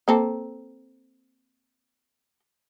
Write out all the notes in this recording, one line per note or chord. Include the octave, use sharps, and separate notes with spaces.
A#3 C4 A4